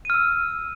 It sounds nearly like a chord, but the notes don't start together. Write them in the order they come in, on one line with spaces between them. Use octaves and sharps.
D#7 F6 E6